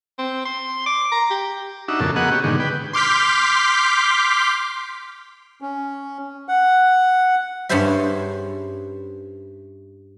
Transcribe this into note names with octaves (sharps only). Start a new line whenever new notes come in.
C4
C6
D6
A#5
G4
D4 D#4 F#4 E5
F2 A#2 C#3 A4
A#3 B3 F#4 G#4 D#5 F#5
C#4 G4
G#2 B2 D3 D#3
B4 G5
C6 D6 F6 G6 B6
C#4
F#5
G2 C#4 E4 G#4 C5 E5